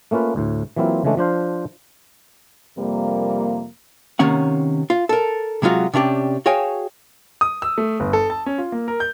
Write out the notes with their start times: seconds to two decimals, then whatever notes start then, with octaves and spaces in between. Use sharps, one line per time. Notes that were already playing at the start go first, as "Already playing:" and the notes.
0.11 A3 A#3 C#4 F4 B4
0.36 D2 A2
0.76 E3 F#3 A#3 C4 E4 F4
1.05 C#3 E3 G#3 A3 D4
1.17 F3 D4 C5 F5
2.78 F2 C3 G3 A#3
4.19 C3 D#3 A#3 C#4 F#5
4.90 F4
5.09 A4 A#4
5.62 C3 F#3 G#3 F4 F#4
5.93 C3 C#4 D4 G4
6.46 F#4 G#4 C#5 F5 G5 G#5
7.41 D#6
7.62 E6
7.78 A3
8.00 G1
8.13 A4
8.30 A5
8.46 C#4
8.58 F4
8.72 A#3
8.88 A#4
9.00 G6